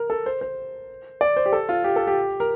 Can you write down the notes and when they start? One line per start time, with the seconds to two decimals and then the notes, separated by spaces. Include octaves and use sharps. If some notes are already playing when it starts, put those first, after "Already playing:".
Already playing: A#4
0.10 A4
0.26 C5
0.41 C5
1.21 D5
1.37 C5
1.46 G4
1.53 A4
1.69 F4
1.84 G4
1.96 A4
2.07 G4
2.40 A#4